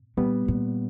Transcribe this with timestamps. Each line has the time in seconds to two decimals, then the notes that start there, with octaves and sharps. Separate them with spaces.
0.17 A#2 G3 B3
0.48 A#2